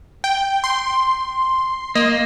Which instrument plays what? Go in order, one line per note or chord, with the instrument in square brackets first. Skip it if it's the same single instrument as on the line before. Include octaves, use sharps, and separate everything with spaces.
[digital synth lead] G5
C6
[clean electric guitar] A#3 [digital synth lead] D#5